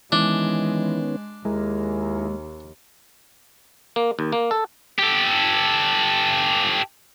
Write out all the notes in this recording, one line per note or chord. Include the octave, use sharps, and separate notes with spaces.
D#3 E3 G#3 B3 C#4 D4
D#2 G#3 E4 G#4 A#4
A#3
D#2
A#3
A4
G4 A4